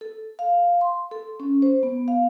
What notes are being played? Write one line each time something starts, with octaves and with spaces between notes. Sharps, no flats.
A4
F5
C6
A4
C#4
C5
B3
F5